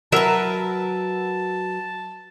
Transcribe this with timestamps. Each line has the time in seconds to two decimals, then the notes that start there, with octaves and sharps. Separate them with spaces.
0.12 F#3 A#4 B4 E5 A5